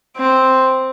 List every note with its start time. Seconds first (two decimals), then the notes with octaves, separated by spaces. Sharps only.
0.17 C4